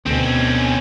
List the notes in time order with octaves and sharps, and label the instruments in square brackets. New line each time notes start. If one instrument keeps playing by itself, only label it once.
[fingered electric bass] D2 B2 [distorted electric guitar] C4 C#4